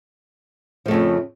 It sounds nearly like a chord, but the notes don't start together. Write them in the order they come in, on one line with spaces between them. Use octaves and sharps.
F3 A3 F2 C#3